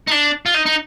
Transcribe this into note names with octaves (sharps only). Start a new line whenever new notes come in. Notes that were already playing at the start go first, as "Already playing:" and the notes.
D#4
D4
F4
D#4
D#4